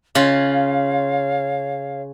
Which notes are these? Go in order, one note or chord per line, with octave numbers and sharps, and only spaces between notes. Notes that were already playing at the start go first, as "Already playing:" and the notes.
C#3 F4 C#5 F5